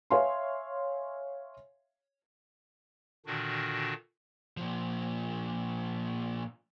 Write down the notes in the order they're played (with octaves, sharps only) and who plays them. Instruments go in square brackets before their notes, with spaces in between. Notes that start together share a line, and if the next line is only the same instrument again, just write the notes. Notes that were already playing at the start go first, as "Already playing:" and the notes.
[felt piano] C#5 E5 F5 G#5 C6
[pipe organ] A#2 D3 D#3 D4 F#4
[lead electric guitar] A#2 F3